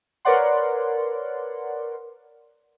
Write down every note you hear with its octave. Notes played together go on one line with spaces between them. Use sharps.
A#4 B4 C#5 D5 F#5 C6